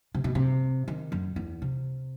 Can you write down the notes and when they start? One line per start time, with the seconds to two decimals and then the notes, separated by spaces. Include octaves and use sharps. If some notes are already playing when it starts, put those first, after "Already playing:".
0.14 C3
0.24 B2
0.35 C3
0.88 D#3
1.12 F#2
1.36 E2
1.62 C3